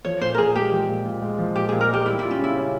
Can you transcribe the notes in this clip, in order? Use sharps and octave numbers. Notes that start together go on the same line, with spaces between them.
F3 C#5
A#2 C5
A#4
A#2 G#4
G#3 G4
F3
A#2
A#2
G#3
F3
A#2 G4
A#2 G#4
A#4
G#3 G4
G3 E4
E4 F4
C#4
C#3 E4
C#4